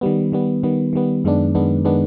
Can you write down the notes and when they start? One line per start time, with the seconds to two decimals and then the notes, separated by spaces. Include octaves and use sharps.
0.01 D#3 G3 B3
0.32 D#3 G3 B3
0.63 D#3 G3 B3
0.93 D#3 G3 B3
1.24 F#2 D#3 G#3 B3 D4
1.55 F#2 D#3 G#3 B3 D4
1.85 D#3 G#3 B3 D4